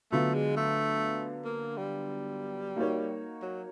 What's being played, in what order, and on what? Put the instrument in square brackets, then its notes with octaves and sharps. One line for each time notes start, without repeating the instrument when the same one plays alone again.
[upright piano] D3 F#3 B3 D4 F4 [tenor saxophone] A3
[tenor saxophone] G#3
A3
A#3
G3
[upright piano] A#3 D#4 F#4 A#4 C#5
[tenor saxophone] F#3